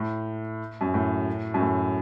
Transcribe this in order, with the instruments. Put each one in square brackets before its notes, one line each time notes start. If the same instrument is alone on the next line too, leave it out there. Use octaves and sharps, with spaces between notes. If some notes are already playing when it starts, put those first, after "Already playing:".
Already playing: [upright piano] A2
F#2
A2
F#2
A2